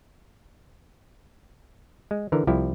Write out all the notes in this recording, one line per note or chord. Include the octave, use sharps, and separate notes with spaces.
G#3
D3 E3 A#4
C2 F3 E4 G4